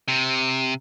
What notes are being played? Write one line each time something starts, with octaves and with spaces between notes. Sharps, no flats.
C3